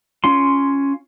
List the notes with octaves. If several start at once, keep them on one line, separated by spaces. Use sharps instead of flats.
C#4 F4 C6